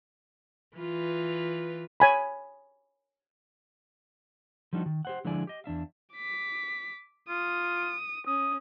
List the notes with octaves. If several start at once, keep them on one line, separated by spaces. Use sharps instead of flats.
E3 F4 B4
C#5 G#5 B5
F3 G3 D4 D#4 F4 F#4
D#3
G4 C5 F#5
D3 F3 G#3 E4 D5 G#5
G4 D#5
E2 D4 E5 F5
D6 B6
F4 D#6
C#4 D#6